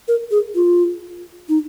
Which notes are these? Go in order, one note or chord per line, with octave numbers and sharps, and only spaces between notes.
A#4
G#4
F4
D#4